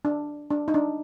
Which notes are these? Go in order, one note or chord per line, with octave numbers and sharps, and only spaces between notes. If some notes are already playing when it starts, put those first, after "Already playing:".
D4
D4
D#4
D4